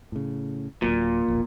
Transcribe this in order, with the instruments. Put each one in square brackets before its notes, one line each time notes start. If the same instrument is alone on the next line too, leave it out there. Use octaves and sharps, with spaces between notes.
[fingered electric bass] A2 C#3
[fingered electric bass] D1 D#2 F#3 [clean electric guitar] A#2
[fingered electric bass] E1 A#1